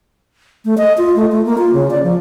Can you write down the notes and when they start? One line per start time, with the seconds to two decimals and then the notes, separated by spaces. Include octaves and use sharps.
0.65 A3
0.78 D#5
0.98 F4
1.16 A3
1.32 A3
1.46 A#3
1.58 F4
1.73 C#3
1.91 D5
2.03 F3